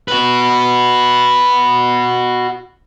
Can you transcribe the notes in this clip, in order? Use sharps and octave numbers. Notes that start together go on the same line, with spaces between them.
F#4 B4